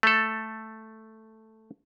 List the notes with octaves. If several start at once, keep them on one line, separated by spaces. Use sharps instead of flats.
A3 A4